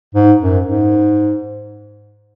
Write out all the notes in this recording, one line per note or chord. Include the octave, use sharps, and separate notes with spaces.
G#2
F#2
G#2